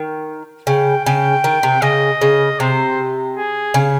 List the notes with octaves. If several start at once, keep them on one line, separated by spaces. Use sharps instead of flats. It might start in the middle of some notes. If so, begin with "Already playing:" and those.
Already playing: D#3
C#3 G5
C#3 G5
D#3
C3
C#3 D#5
C#3
C3 C5
G#4
C#3